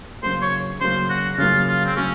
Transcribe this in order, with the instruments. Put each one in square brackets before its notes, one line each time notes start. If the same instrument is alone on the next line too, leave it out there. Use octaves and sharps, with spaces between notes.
[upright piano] C#3 F#3 A#3 [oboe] C5
[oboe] C#5
[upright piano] C#3 F#3 A#3 [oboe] C5
[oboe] F#4
[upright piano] C#3 F#3 A#3 [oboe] F4
[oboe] F4
C4
[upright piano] C#3 F#3 A#3 [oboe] C#4